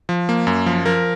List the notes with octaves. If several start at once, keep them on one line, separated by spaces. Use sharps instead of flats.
F3
A#3
F#2
F3
F3 A#4